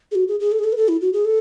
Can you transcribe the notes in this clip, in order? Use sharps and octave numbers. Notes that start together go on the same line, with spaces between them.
G#4
F#4
G#4
G#4
A4
G#4
A4
B4
A4
E4
F#4
G#4
A4